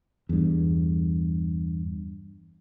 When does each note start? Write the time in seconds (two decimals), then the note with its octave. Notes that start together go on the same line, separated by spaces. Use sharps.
0.29 E2 G2